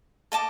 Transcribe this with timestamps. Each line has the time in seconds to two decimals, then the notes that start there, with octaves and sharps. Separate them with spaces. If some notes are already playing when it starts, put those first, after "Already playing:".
0.32 A4 D#5 A5 D6